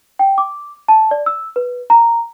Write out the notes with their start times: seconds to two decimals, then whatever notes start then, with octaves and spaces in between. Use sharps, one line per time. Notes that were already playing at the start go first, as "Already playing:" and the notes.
0.19 G5
0.38 D6
0.88 A5
1.11 D5
1.26 E6
1.56 B4
1.90 A#5